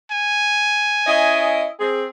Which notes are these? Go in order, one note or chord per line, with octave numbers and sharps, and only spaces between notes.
G#5
C#4 E4 D#5
C4 G#4